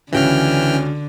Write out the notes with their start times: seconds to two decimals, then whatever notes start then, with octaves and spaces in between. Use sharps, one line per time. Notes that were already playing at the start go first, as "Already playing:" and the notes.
0.12 C#2 D3 E3 C#4 F#4 G5 F6 A#6